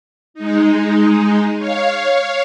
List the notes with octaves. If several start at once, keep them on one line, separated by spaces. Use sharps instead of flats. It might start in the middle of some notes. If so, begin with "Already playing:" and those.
G#3 D#4
C#5 F5